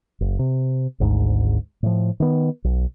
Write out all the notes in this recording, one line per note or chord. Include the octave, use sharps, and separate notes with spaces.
F#1
C3
G#1 D2 G#2
A2 F3
D#3 B3
B1